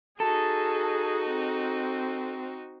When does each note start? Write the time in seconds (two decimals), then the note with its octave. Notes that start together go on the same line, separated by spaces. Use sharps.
0.20 D#4 F#4 G#4 A4
1.27 C4